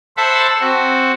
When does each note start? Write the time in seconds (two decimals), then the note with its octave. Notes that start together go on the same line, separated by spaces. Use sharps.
0.17 A4 C5 E5 F#5 A5 B5
0.61 C4 F#4